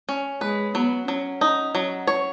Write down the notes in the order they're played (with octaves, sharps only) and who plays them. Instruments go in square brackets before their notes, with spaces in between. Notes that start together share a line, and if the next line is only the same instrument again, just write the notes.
[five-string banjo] C#4
[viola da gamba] G#3 [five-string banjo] B4
[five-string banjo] F#3 [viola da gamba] B3
[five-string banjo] F#3 [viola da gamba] C#4
[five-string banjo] D#4
F#3
C#5